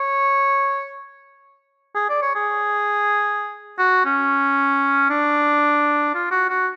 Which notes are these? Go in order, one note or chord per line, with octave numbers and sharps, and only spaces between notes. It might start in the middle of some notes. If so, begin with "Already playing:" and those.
Already playing: C#5
G#4
D5
C#5
G#4
F#4
C#4
D4
F4
F#4
F#4